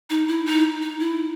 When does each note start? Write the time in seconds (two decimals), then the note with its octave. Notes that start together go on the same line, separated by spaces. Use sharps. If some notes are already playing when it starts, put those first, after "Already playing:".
0.10 D#4
0.28 E4
0.46 D#4
0.82 D#4
1.00 E4